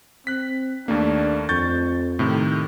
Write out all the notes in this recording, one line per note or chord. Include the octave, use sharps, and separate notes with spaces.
C4 F#6 B6
D#2 A3 A#3 D4
F2 C#6 G6 A6
A2 C3 D#3